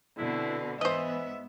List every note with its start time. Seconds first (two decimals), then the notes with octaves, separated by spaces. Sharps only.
0.18 B2 D3 C4 E4
0.81 G#2 E3 B3 C5 D#5 E5